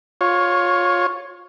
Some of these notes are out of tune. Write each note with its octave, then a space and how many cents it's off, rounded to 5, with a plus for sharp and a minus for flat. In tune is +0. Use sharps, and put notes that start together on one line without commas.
F4 +20 C#5 +0